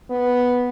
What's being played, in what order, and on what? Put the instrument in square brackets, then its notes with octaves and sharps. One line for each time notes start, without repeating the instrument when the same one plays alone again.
[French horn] B3